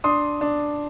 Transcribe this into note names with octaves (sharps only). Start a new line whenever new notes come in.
D4 C6 D#6
D4